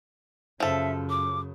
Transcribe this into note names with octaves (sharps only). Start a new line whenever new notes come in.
F#2 C#3 F3 A4 E5
D6